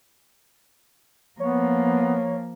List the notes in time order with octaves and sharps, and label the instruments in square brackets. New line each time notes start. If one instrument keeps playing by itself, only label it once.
[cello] F3 A#3 [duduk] B3 [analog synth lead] C#5